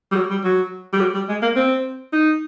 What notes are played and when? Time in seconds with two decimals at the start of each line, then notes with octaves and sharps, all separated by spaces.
0.12 G3
0.16 F#3
0.30 G3
0.44 F#3
0.93 G3
1.00 F#3
1.14 G3
1.29 G#3
1.42 A#3
1.56 C4
2.13 D#4